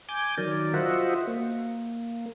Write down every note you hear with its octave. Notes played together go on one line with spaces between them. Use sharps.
G#5 D6 G6
D#3 F#3 A#4 D5
F4 F#4 C5 D#5 E5 F#5
A#3